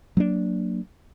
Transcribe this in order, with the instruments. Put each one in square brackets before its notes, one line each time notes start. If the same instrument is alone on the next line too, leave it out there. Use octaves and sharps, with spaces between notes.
[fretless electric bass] F#3 A#3 C4 D4